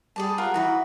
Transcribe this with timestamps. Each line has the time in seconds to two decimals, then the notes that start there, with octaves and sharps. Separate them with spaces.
0.16 G3 G#4 D5 A5
0.38 F4 A#4 F#5
0.54 E3 D#4 F#4 B4